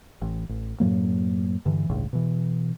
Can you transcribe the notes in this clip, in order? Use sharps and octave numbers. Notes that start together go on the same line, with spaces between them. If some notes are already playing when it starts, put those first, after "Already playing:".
A1
A1
F#2 A2 F#3 A#3
G2 D3 E3
G1 C#2 A2
B2 E3